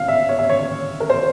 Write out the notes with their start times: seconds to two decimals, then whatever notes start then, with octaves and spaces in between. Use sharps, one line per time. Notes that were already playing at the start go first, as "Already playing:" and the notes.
Already playing: F5
0.08 E5
0.29 C#5
0.39 E5
0.49 C#5
1.00 A#4
1.10 C5